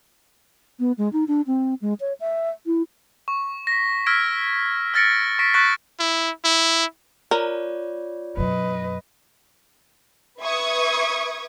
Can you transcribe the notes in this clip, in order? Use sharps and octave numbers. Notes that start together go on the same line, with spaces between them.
B3
G#3
D#4
D4
C4
G#3
C#5
E5
E4
C#6
A#6 B6
E6 F6 G#6 A#6 B6 D7
E6 F6 A6 A#6 C#7 D7
C#6 A#6 B6 D7
C#6 F#6 A6 B6 D7
E4
E4
F4 A#4 C#5 D5
F#2 B2 B4 D#5
B4 E5 C#6 D#6 G#6